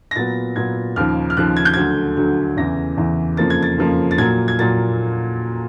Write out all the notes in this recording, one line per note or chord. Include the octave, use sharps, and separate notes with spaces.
A#6
A#2 F#3 B3 A6
A#2 F#3 B3 G#6
D#2 C#3 F3 F6
F6
D#2 C#3 F3 F#6
G#6
G6
D2 D3 F#3 G#6
D2 D3 F#3
E2 C#3 E3 A#6
E2 C#3 E3
F2 C#3 F3 A#3 A6
G#6
A6
F2 C#3 F3 A#3
A6
A#2 F#3 A#3 G#6
G#6
A#2 F#3 A#3 A6